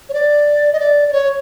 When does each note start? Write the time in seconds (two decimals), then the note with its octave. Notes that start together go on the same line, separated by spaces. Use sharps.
0.09 C#5
0.14 D5
0.73 D#5
0.80 D5
1.08 D5
1.13 C#5